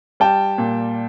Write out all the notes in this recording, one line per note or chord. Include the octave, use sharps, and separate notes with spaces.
G3 G5 A5
A#2